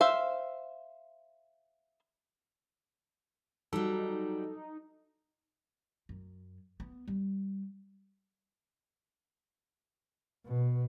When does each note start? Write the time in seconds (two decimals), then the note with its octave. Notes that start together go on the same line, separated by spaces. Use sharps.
0.01 C5 E5 F5
3.73 F#3 G3 D#4 A4
6.09 F#2
6.80 B3
7.08 G3
10.46 B2